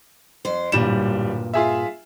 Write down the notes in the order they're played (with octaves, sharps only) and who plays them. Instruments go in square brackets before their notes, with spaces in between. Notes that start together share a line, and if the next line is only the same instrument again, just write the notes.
[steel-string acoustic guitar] F2 C5
[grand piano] D1 G3 E7 [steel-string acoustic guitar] G2 A#2
[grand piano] F4 G#4 E5